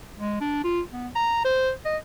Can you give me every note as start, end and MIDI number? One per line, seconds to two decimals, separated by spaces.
0.19 0.40 56
0.41 0.63 62
0.64 0.81 65
0.92 1.08 59
1.15 1.42 82
1.45 1.72 72
1.85 1.97 75